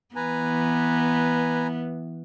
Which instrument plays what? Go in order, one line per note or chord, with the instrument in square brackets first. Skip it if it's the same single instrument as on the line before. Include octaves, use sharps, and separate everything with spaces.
[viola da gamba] E3 B3 [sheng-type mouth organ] B4 G#5 A#5